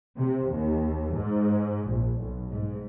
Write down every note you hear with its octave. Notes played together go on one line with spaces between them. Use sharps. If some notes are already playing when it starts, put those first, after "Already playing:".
C3
D#2
G#2
A#1
B1
G#2